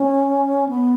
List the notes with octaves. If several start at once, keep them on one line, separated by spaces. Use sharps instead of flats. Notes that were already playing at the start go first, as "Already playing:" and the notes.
Already playing: C#4
B3